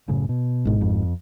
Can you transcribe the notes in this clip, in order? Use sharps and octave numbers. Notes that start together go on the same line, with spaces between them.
F#1 A2 C#3
B2
G#1 G#2
F2